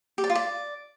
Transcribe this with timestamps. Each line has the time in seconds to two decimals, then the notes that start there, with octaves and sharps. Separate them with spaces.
0.18 G4
0.24 D5
0.30 F4
0.35 D5